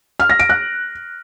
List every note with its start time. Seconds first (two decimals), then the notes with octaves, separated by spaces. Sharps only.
0.20 F6
0.30 A#6
0.40 D7
0.49 F#6